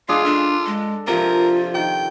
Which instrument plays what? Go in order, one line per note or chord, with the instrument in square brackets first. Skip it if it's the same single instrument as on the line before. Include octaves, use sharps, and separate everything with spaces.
[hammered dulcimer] G#3 D4 G#4 [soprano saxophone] F4 [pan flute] F5
[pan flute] D4 [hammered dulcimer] A4
[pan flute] G#3
[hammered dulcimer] C3 F3 [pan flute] F4 [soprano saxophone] A#4
[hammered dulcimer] D#3 [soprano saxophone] G5